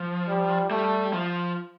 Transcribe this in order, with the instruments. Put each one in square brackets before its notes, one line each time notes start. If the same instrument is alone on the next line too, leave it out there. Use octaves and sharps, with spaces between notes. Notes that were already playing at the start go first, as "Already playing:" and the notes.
Already playing: [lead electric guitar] F3
[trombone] G3
[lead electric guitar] G3 [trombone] A3
[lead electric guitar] F3